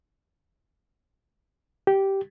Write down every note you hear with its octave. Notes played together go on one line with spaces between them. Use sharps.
G4